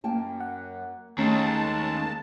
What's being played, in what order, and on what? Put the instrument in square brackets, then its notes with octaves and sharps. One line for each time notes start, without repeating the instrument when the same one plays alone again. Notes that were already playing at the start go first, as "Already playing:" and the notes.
[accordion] F#2 [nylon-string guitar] A#3 G5 A5
[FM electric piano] F#5
[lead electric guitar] D#2 [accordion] G#3 A5 [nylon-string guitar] A3 [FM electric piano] C#4 A#5